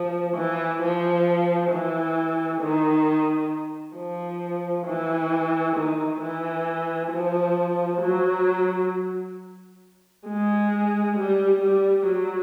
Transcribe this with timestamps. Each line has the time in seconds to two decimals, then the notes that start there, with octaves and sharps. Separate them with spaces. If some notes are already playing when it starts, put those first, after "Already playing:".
Already playing: F3
0.36 E3
0.81 F3
1.71 E3
2.61 D#3
3.96 F3
4.86 E3
5.76 D#3
6.21 E3
7.12 F3
8.01 F#3
10.27 G#3
11.16 G3
11.62 G3
12.07 F#3